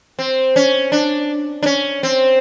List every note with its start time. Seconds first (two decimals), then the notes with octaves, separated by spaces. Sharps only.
0.19 C4
0.56 C#4
0.92 D4
1.63 D4
1.66 C#4
2.03 C4